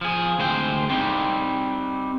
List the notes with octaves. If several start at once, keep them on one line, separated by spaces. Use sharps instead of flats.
F3 G#4
D2 G#3 C5 G5
G3 C4 D#4